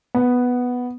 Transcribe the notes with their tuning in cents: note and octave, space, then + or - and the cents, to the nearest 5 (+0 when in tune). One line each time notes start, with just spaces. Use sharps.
B3 +0